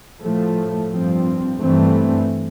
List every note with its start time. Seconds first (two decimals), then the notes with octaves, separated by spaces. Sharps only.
0.22 A2 F3 A3
0.91 G2 F3 C4
1.58 G2 E3 A3 C4